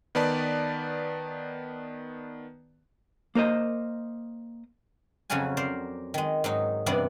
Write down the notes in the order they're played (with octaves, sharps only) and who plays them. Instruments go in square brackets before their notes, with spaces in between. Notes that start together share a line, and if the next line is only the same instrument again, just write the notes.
[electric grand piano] D#3 B3 B4 D5 A5
[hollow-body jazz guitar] A#3 A#4 C5 D#5
[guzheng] F2 C#3 F#3 C#4 F#4 G#5
A#4 C5 D5
D#3 G#3
G#2 F#3 D#4
E2 G2 C3 B3 D5 F#5